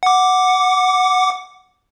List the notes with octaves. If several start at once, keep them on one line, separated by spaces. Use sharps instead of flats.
F#5 D6